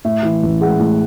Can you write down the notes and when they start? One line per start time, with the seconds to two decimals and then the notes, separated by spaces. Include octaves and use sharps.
0.05 A2 E5
0.23 E3
0.42 A1
0.61 G#3 F#5
0.80 A2